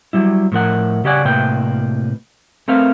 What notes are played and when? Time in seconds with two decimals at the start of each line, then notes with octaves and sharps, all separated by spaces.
0.13 F#3 G3 E4
0.52 A2 F3 A#4 F#5
1.04 C#3 G4 C#5 D5 F#5 G#5
1.25 A2 C3 A#3 B4 G5
2.68 A3 C4 A#4 B4 F5